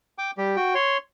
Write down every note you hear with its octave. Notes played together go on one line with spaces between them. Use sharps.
G5 D6
G3 G4
F#4 G5
C#5 C6